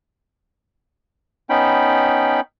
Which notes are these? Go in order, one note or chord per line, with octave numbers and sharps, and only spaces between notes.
B3 C#4 D#4 G5 B5